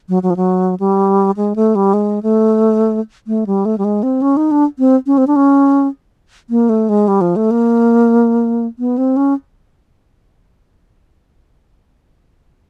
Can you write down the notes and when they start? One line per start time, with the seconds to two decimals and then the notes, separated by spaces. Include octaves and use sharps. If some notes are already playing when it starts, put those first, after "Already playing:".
0.09 F#3
0.23 F#3
0.30 F3
0.36 F#3
0.80 G3
1.36 G#3
1.56 A3
1.75 G3
1.94 G#3
2.23 A3
3.27 A3
3.47 G3
3.65 A3
3.78 G3
3.84 G#3
4.03 C4
4.22 C#4
4.37 D#4
4.51 D4
4.79 C4
5.06 C#4
5.18 C4
5.27 D4
5.36 C#4
6.50 A#3
6.69 A3
6.89 G#3
7.08 G3
7.21 F3
7.36 A3
7.51 A#3
8.79 B3
8.98 C4
9.16 C#4